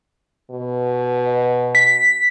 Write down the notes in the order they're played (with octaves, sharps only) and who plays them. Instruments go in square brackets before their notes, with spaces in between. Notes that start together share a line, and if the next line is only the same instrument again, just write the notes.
[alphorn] B2
[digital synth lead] B6